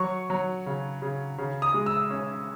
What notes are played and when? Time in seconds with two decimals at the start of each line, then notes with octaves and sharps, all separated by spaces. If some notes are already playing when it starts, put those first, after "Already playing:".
Already playing: F#3 C#6
0.30 F#3
0.66 C#3
1.02 C#3
1.38 C#3
1.62 D#6
1.74 G#3
1.86 E6
2.10 C#4